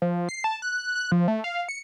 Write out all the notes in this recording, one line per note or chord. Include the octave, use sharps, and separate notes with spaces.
F3
C7
A5
F#6
F#6
F3
A3
F5
C#7